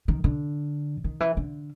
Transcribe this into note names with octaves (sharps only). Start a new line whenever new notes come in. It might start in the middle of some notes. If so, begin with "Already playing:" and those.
D#3
D3
D#3
E3
D3